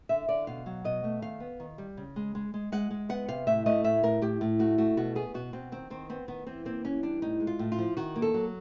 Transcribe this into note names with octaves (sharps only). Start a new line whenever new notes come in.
D3 E5
D3 D5
B2 F5
F#3
B2 D#5
A3
D#3 F5
B3
D#3
G3
C#3
G#3
G#3
G#3
G#3 F#5
G#3
B3 F#5
C3 F5
A2 E5
A3 D#5
A2 E5
A2 A#4
A2 G4
A2
A3 F#4
A3 F#4
B2 F#4
B3 G#4
B2 F#4
B2 C4
D#3 C4
D#3 C4
B3 C4
D#3 B3
E3 C4
A#3 C4
E3 C#4
G3 D4
A2 D#4
G#3
F4
A2
F4
F3
D#3 F#4
A#3
A4
F#3